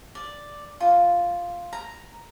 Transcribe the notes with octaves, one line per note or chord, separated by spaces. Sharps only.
D5
F4
A#5